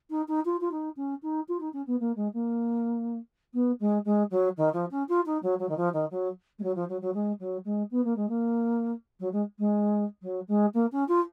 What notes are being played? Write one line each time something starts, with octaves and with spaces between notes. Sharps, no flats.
D#4
D#4
F4
F4
D#4
C#4
D#4
F4
D#4
C#4
B3
A#3
G#3
A#3
B3
G#3
G#3
F#3
D#3
F3
C#4
F4
D#4
F#3
F#3
D#3
F3
D#3
F#3
G#3
F#3
F3
F#3
F#3
G#3
F#3
G#3
B3
A#3
G#3
A#3
F#3
G#3
G#3
F#3
G#3
A#3
C#4
F4